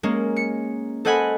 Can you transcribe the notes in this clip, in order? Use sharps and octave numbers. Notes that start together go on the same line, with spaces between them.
G#3 A#3 C#4
C#7
A4 C5 D#5 F#5 G#5 B5